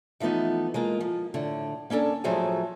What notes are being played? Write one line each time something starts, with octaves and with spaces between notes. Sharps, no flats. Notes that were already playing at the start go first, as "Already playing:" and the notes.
E3 F3 A3 B3 D#4
G#3 A#3 F4
F3
A2 D3
A#3 C#4 D4 A4
A2 F3 F#3 A3 G#4 G#5